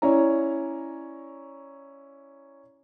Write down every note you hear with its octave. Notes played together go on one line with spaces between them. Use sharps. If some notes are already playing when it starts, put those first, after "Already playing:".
C#4 E4 C#5 D5 A#5